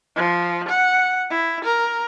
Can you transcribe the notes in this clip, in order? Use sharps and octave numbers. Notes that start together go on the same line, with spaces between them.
F3
F#5
E4
A#4